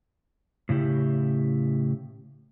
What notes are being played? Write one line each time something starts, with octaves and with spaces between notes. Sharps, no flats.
A2 C#3 E4 G4